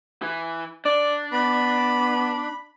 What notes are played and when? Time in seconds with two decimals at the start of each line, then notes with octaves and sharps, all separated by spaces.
0.22 E3 E4
0.85 D4 D5
1.32 B3 B5